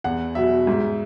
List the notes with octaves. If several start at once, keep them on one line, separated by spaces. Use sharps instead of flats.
E2 F#5
B2 F#3 E5
G#2